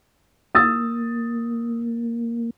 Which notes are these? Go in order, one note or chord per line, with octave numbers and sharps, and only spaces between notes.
A#3 D#6 E6 A6